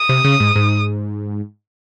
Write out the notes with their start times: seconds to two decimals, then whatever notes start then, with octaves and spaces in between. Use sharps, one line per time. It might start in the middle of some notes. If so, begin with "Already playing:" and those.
Already playing: D#6
0.09 C3
0.24 C#3
0.40 G#2
0.56 G#2